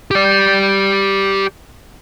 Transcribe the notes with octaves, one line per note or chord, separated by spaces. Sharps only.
G4 D5